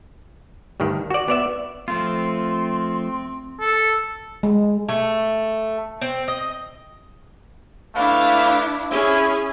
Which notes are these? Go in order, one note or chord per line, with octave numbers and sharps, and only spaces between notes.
D2 G2 D#3
F#4 D5
B3 D5 E5
F3 A3 C4 F4 C6
A4
G#3
A3
C4
D#5
A3 D4 E4 B4 F5
C#4 E4 G#4